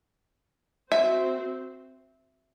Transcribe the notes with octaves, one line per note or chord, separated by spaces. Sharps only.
C4 F#4 C5 E5